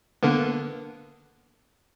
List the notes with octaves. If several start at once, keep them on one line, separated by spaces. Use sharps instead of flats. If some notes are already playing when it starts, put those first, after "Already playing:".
D3 A#3 B3